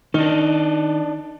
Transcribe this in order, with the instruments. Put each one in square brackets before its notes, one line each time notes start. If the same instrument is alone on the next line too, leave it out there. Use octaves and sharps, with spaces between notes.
[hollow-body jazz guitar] D#3 [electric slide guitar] D4 D#4